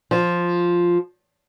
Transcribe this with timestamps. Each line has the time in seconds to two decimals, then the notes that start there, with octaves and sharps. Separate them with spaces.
0.11 F3